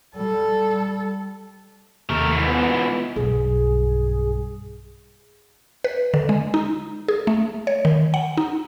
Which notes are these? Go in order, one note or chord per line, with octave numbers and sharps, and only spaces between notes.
G3 A4
D#2 C3 A3 A#4
G#2 E3
B3 F4 B4
B1 G2 G#4
B4
D3
G#3
D#4
G#4
A3
C#5
D#3
F#5
D#4